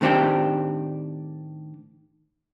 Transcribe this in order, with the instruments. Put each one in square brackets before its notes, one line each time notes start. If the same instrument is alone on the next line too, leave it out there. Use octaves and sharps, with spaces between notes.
[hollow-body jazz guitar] A2 D#3 C4 D4 G4